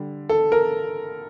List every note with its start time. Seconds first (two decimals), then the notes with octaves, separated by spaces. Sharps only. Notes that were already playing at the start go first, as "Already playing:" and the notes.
Already playing: D3 G3
0.29 A4
0.52 A#4